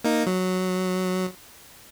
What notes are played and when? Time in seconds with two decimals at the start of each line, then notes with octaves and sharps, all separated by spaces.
0.04 A#3 D#4
0.26 F#3